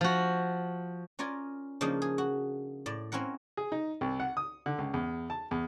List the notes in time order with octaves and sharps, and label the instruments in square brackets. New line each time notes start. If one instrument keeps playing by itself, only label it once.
[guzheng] F3 F#4
C#4 F4 A#4 D5 G#5
C#3 F3 A#3 D4 D#4
G#4
F#4
A2 D5
C4 C#4 E4 A#4 F#5
[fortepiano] G#4
D#4
C2
F#5
D#6
D3
C#2
E2
A5
E2